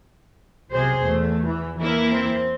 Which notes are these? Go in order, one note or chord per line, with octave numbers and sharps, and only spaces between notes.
B1 C3 G#4 C5
E2 A3
E3
E3 A#3 E4
C4